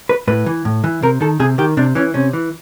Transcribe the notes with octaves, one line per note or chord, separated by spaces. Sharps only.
B4
A2 B4
E3
A2
E3
C3 A#4
D#3 A4
C3 G#4
D#3 G4
C3 D4
E3 C#4
C3 C#4
E3